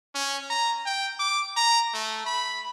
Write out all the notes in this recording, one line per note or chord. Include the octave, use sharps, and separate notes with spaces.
C#4
A#5
G5
D6
A#5
A3
B5